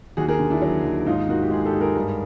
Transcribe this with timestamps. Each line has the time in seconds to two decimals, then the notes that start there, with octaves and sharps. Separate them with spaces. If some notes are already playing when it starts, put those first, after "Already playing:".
0.17 D#2 F#4 G#4
0.29 G#4 A#4
0.39 D3
0.50 D4 E4
0.62 F#3
0.84 D#2
1.06 G#2 D#4 F4
1.29 D#3 F#4
1.42 G4
1.51 G#3 G#4
1.66 G4 A4
1.74 G#2
1.80 G#4 A#4
1.96 G2